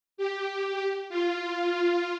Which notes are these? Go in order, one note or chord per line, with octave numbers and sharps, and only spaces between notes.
G4
F4